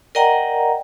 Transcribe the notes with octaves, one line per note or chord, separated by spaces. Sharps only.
A#4 D5 D#5 F#5 G5 A#5